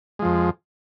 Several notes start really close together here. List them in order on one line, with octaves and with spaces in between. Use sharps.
G#3 F3 F2